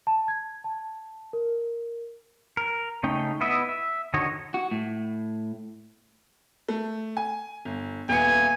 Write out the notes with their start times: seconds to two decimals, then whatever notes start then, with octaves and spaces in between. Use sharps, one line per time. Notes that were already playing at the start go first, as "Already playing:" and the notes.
0.07 A5
0.28 G#6
0.64 A5
1.33 A#4
2.57 A#4
3.03 C#3 A3 C#4 D#4 G5
3.41 B3 E4 D#5 E5
3.69 E5
4.14 D3 D#3 F#4 C#5 D#5
4.54 F#4
4.71 A2
6.68 A3
7.17 G#5
7.65 G1
8.09 D#1 B3 G#5 C#7